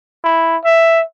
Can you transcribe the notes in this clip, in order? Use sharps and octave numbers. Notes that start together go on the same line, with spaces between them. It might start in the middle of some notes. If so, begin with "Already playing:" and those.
E4
E5